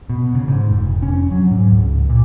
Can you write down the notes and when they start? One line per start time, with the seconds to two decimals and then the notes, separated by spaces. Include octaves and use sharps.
0.09 B2
0.35 C#3
0.48 G#2
0.71 F1
1.02 C#4
1.31 F#3
1.51 G#2
1.70 C#2
2.10 A#2